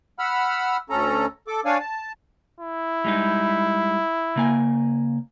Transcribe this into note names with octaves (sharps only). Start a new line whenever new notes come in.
F#5 B5 E6 F6
D2 C#4 A4 A#5
A4 D6
D4 C#5 D5 F5 G#5
A5
E4
G3 G#3 D#4
C#3 A#3 G#5